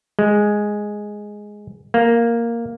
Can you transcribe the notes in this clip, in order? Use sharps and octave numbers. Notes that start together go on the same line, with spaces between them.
G#3
A#3